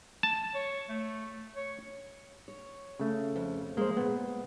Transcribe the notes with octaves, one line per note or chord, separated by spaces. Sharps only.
A5
C#5
A3
C#5
C#5
C#3 A3
F2
G#3 A#3 C5
A#2 B3